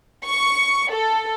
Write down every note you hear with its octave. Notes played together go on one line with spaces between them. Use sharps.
C#6
A4